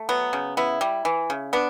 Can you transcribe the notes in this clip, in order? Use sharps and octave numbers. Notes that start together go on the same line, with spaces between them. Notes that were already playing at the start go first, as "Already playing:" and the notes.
Already playing: A3
F#3 B3
C#3
B3 E4
G3
E3
C#3
B3 D4